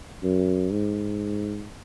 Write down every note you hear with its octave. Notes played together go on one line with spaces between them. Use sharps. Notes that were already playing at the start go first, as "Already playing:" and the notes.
F#2
G#2